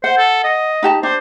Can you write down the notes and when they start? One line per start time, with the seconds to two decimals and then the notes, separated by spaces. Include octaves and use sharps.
0.04 C5 F#5
0.18 A4
0.44 D#5
0.83 D#4 G4 A5
1.03 D4 C5